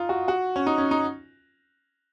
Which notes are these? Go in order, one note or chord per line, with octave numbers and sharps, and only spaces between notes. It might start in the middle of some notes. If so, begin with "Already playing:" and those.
Already playing: D#4 F4
F#4
F#4
C#4
D#4
C#4
D#4